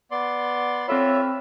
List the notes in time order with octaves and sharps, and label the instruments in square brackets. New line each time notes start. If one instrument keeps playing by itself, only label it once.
[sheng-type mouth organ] B3 D5 C6
[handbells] C4 A4 B5 [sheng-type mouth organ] F4 E5 [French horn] C#5